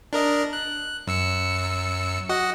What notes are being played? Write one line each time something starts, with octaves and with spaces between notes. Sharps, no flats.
D4 A#4 D#5
F#6
F#2 E6 C#7
F#4 D#5 F#5